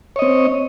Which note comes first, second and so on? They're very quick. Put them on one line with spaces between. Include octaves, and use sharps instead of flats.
C#5 D#5 C4